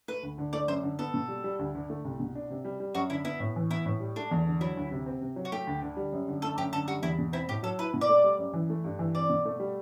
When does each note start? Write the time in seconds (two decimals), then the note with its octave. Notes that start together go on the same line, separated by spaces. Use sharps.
0.08 A3 B4
0.23 D2
0.38 D3
0.53 A3 D5
0.68 F#2 C5
0.83 D3
0.99 B3 A4
1.14 B2
1.28 G3
1.44 G3
1.59 D2
1.75 D3
1.90 A3
2.05 C2
2.20 B2
2.35 D4
2.50 C3
2.65 G3
2.80 G3
2.94 F#2 F#4
3.10 D3 E4
3.25 B3 E4
3.40 A2
3.56 E3
3.70 B3 E4
3.86 A2
4.00 G3
4.16 A3 D4
4.31 E2
4.47 D3
4.61 F#3 E4
4.77 D2
4.91 C3
5.06 C4
5.21 C3
5.36 F#3
5.45 F#4
5.52 A3 G4
5.67 D2
5.82 D3
5.97 G3
6.12 F#2
6.28 D3
6.42 A3 A4
6.58 F#2 G4
6.73 D3 A4
6.88 G3 F#4
7.02 E2 E4
7.18 B2
7.33 C4 E4
7.48 A2 G4
7.63 F#3 A4
7.79 E4 B4
7.94 B2
8.01 D5
8.09 A3
8.24 G3
8.38 F#2
8.53 E3
8.70 A3
8.84 G2
8.99 E3
9.15 C4 D5
9.30 B2
9.45 A3
9.60 G3